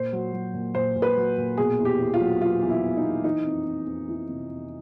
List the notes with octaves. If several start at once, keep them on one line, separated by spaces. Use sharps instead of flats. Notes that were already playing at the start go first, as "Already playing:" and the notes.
Already playing: A#2 C5
F#3
F#3
A#2
A#2 C5
A#2
B4
F#3
A#2
B2 G#4
E2
G4
E2
F4
F#3
F#3 F4
E2
E4
E2
D#4
E2
E3 D#4
F2
F2
F2
E3
C3
F2